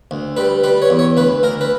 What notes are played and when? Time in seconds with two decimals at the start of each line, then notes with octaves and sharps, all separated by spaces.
0.11 D2
0.37 G3 B4
0.64 G3 B4
0.82 C#5
0.90 E2
0.99 C#5
1.17 D2 B4
1.43 D2 A#4
1.61 B4